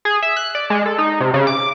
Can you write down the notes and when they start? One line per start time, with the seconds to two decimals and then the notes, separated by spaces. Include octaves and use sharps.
0.05 G#4
0.22 E5
0.37 F#6
0.55 D5
0.70 G#3
0.86 A4
0.98 D#4
1.20 C3
1.34 C#3
1.47 D6